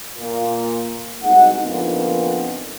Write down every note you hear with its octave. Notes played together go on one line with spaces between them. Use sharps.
A#2
C2 B2 G#3 D#4 F#5
F2 A#2 D3 D#3 B3